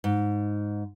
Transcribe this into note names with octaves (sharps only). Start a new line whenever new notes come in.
G#2